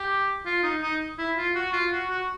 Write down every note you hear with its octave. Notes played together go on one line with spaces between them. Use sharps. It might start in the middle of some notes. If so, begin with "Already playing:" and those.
Already playing: G4
F4
D#4
D#4
E4
F4
F#4
F4
F#4
F#4